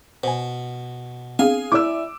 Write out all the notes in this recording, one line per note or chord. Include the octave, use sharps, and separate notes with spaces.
B2 C5 G#5
B3 C4 D4 G#4 F5 G#5
E4 D5 D6 E6